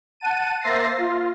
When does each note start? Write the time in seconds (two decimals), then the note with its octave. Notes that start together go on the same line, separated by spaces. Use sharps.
0.20 F#5 A5 D#7
0.61 A#3 C5 E5 A6 A#6 C7
0.97 F4